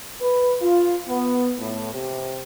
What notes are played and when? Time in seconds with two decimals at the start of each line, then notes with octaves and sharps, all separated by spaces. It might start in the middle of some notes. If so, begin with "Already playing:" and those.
0.21 B4
0.62 F4
1.08 B3
1.59 A2
1.93 C3